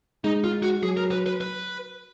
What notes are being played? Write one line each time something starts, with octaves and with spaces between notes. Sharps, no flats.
G#3 D#4
F4
F#4
F#3 G#4
A#4
B4
B4
B4